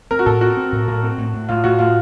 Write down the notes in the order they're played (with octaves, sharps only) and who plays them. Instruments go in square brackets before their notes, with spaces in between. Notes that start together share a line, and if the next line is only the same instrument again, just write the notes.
[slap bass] C4 [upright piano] A#4
[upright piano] F#4
[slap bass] A2 [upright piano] A4
[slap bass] C4 [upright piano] F#4
[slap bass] C4
A2
A2
C4
A2
A2
[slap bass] A2 [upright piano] F4
[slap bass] A2 [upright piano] F#4
[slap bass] A2 [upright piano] F4